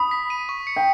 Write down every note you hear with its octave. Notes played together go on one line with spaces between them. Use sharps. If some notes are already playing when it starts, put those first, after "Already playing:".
Already playing: B5 D#6
B6
D#7
C#6
C#7
G5